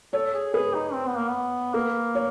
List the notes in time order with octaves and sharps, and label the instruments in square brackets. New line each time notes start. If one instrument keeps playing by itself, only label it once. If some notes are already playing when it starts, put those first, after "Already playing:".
[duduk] A4 [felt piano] C#5
[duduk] G#4
[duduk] G#4 [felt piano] B4
[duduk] D#4
C4
B3
A#3
B3
[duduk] A#3 [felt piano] B4
[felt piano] C#5